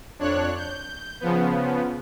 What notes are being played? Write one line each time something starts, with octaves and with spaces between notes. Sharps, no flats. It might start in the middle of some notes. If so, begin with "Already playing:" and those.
F2 D4 C#5 F#6
G6
C#3 F3 B3